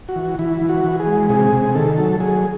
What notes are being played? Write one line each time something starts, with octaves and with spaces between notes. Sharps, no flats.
F#4
E3
E3 E4
E3
F#4
E3
G#4
G#3
C3 G#4
C3
D#3 A4
F#3
F#3 G#4